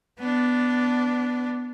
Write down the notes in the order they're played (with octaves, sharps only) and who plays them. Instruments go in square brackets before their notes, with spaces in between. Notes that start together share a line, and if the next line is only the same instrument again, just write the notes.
[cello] B3 D4